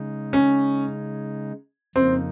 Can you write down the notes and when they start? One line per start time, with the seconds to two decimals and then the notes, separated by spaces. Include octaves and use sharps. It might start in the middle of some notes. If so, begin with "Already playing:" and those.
Already playing: C#3 G#3 D#4
0.33 C#4
1.96 F2 C#3 F3 A#3 C4 D#4